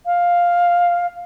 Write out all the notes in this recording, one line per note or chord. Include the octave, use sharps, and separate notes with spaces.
F5